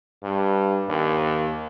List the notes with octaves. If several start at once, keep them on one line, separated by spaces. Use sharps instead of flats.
G2
D#2